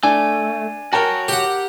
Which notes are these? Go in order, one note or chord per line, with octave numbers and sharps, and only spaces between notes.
A3 D4 G#5
F#4 A#4 C#5 G5 A5
G4 F#5